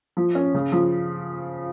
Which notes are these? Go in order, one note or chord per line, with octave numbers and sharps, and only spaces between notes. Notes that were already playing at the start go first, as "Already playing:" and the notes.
F3
C#4
C#3
F3